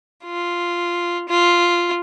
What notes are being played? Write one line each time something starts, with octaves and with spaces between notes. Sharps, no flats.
F4
F4